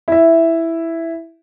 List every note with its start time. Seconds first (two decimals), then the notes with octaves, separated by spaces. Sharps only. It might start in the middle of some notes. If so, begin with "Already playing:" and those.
0.08 E4 E5